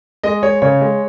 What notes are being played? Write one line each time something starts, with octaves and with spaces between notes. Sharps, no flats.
G#3 D#5
G#3 C#5
C#3 C#5
G#3